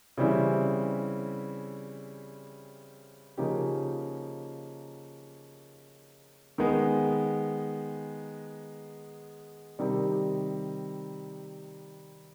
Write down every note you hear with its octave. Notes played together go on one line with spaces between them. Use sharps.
C#3 E3 G3 C4 E4
C#3 F3 A#3 D#4 G4
D#3 G#3 B3
C3 D#3 G3